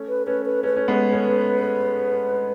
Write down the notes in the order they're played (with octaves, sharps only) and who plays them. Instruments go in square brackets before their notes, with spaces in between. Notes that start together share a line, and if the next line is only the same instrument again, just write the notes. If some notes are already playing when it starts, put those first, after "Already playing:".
Already playing: [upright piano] A3 C#4
[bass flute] B4
[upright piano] A3 C#4 [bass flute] B4
[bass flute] B4
[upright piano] A3 C#4 [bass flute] B4
[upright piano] C#4
G#3 B3
A3 C#4